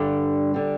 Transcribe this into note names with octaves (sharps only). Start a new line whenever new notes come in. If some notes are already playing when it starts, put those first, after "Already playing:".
Already playing: G2 D3 G3
D3 G3